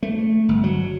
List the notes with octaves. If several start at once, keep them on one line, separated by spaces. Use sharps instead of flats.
A3
G1
F#3